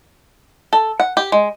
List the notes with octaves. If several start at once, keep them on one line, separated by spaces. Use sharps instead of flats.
A4
F#5
G4
G#3